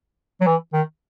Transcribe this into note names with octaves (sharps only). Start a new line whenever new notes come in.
F#3
E3
D#3